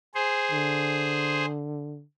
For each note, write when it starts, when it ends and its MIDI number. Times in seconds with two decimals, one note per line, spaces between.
0.15 1.45 68
0.15 1.45 72
0.52 2.03 50